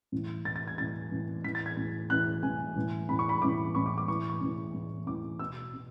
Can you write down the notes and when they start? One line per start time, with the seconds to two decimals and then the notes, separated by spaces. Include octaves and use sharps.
0.12 A2 E3
0.45 A2 E3 A6
0.56 A6
0.68 G#6
0.78 A2 E3 A6
1.12 A2 E3
1.44 A2 E3 B6
1.55 A6
1.66 G#6
1.77 A2 E3
2.10 A2 E3 F#6
2.43 A2 E3 G#5
2.76 A2 E3
3.09 A2 E3 B5
3.19 C#6
3.29 B5
3.42 A2 E3 D6
3.75 A2 E3 C#6
3.86 D6
3.98 D6
4.08 A2 E3 C#6
4.30 C#6
4.41 A2 E3
4.74 A2 E3
5.07 A2 E3 D6
5.39 B2 E6
5.73 B2